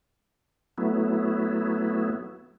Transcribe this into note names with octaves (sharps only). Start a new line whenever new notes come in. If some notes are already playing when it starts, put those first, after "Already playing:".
F#3 A3 B3 E4